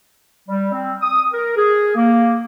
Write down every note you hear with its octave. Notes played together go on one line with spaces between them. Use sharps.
G3
C4
D#6
A#4
G#4
A#3